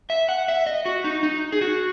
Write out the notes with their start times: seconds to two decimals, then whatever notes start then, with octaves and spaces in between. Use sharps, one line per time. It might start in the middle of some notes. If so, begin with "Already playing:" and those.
0.10 E5
0.29 F#5
0.48 E5
0.66 D#5
0.86 F#4
1.04 D#4
1.23 D#4
1.52 G#4
1.61 F#4